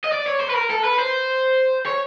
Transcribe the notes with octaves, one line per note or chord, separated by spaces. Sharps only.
D#5
D5
C#5
C5
B4
A#4
A4
B4
C5
C#5